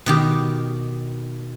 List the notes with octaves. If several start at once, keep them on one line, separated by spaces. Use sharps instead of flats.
B2 D#3 G4